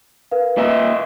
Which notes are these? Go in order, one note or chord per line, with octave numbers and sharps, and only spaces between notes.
A#4 B4 F5
A#2 D#5 E5